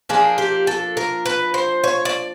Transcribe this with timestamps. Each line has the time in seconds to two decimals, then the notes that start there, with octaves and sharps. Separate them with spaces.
0.09 F3 A#3 D4 G#4
0.38 G4
0.67 A4
0.97 A#4
1.25 B4
1.54 C5
1.84 C#5
2.05 D5